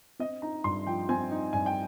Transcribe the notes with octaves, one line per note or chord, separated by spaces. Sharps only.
C4 D#5
D#4 A#5
G2 C6
F3 G5
C4 G#5
D#4
G2 G#5
G5